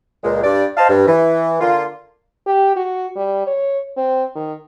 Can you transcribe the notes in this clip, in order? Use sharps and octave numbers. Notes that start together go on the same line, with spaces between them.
C#2 A#2 G#3
G2 D5
C5 D#5 F5 A5
G2
E3
D3 A#3 F4
G4
F#4
G3
C#5
C4
D#3